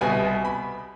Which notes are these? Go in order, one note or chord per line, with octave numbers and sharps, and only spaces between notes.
C2 B2 G#5
B5